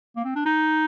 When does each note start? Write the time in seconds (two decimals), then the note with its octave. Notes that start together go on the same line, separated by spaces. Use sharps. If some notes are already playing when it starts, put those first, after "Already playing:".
0.16 A#3
0.25 C4
0.36 D4
0.46 D#4